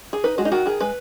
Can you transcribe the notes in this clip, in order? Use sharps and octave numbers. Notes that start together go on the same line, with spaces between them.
G#4
D#4 B4
G#3 F#4
D#4
D#3 F#4
D#3 G#4
G#3 B4